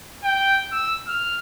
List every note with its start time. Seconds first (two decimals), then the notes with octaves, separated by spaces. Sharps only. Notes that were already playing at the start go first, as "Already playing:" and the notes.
0.24 G5
0.72 E6
1.08 F6